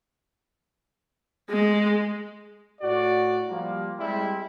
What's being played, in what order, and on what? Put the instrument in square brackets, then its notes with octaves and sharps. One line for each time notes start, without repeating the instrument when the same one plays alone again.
[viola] G#3
[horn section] A2 F#4 D5
F3 G3 A#3
G3 G#3 C4 E4